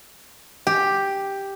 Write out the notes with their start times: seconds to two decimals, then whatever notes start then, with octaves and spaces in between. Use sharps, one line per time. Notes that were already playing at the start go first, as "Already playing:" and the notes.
0.67 G4